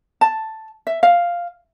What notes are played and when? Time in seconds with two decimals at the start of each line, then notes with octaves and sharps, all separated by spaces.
0.21 A5
0.87 E5
1.03 F5